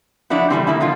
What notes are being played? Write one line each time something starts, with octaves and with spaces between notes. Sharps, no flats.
F3 F#3 D4 E4 F#4
A2 E3 G3 C4
D#3 A#3 E4 A5
B2 D3 F3 F4